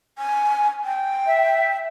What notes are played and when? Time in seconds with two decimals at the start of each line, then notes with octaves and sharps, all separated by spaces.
0.18 G#5
0.84 G5
1.27 E5